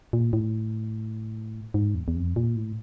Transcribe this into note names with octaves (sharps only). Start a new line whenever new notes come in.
A#2
A2
G#2
E2
E2
F2
A#2
A2